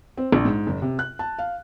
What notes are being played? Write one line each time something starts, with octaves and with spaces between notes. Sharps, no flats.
C4
A#1
G#2
F#1
C3
F#6
A5
F5